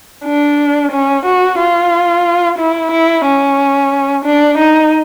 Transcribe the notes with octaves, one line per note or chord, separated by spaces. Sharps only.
D4
C#4
F#4
F4
E4
E4
C#4
D4
D#4